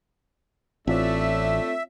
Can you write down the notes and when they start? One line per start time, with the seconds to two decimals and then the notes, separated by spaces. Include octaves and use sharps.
0.87 A1 A3 C4 D4 F4 C#5 E5